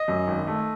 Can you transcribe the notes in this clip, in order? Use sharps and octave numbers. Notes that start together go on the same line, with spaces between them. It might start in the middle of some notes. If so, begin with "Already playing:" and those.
Already playing: D#5
F#2
G#1
A3